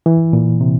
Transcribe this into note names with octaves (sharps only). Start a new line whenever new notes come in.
E3
A#2
C3